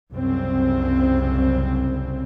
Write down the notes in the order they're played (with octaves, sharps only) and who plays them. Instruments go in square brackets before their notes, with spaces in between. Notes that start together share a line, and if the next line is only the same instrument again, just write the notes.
[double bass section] C2 F#2 C#3 C4